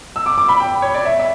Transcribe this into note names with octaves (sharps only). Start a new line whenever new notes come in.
E6
D6
D6
B5
G5
C#5
D5
E5
E5